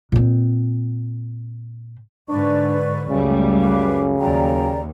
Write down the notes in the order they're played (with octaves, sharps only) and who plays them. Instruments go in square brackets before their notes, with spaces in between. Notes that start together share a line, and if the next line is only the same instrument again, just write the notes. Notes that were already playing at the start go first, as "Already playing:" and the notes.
[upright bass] A#2 C4
[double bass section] G#2 D3 [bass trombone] D4 [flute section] B4 D5 C#6
[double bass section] C#2 G3 A3 [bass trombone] F#2 [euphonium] C#3
[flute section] B4 F5 D6
[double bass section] D#2 [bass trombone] F#3 [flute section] D5 G5 A#5